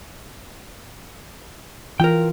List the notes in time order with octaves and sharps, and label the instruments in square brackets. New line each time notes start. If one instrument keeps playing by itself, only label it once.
[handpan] E3 F4 [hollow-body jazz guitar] A#4 G5